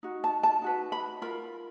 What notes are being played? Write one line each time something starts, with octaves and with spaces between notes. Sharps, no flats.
D#4 F#4
A5
A5
D#4 F#4 B4
B5
F4 A#4 B5